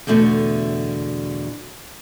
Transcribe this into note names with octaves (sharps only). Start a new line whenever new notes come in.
E2 B2 D3 A3